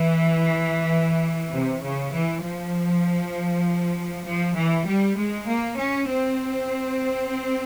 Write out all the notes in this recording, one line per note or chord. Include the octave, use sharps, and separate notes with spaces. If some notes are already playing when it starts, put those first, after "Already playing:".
Already playing: E3
C3
C#3
E3
F3
F3
E3
G3
G#3
A#3
C#4
C4